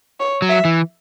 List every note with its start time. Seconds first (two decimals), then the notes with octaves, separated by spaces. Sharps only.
0.20 C#5
0.42 F#3
0.49 E5
0.65 E3